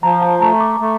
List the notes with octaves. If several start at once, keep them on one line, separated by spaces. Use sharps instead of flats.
F3 A#5
A5
A3 A#5
D6
A3